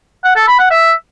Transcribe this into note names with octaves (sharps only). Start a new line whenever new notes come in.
F#5
A4
B5
F#5
E5